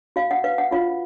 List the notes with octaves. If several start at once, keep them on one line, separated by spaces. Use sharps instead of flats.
F#4 F5
F#5
B4 F5
F#5
F4 F#4 F5